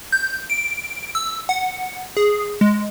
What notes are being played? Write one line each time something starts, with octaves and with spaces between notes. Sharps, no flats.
G6
D7
E6
F#5
G#4
G#3